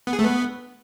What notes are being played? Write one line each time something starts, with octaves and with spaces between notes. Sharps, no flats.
B3
G#4
A3
B3